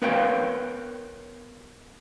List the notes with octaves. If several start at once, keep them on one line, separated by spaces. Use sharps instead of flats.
B3 A#4 B4 C#5 F5 G5